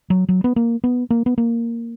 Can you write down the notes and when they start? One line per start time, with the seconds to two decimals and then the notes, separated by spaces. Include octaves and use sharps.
0.10 F#3
0.29 F#3
0.44 B3
0.56 A#3
0.84 B3
1.10 A#3
1.26 B3
1.38 A#3